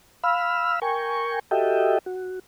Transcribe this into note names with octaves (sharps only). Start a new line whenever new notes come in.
F5 B5 E6 F6
A#4 G5 G#5 C#6
F#4 G4 A4 D#5 E5 G5
F#4